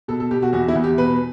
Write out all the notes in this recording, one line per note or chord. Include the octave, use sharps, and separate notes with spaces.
B2 A4
A4
B2 G4
F#4
E2 F#4
E4
E2
G4
B2 B4